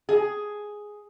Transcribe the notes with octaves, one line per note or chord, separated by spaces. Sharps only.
G#4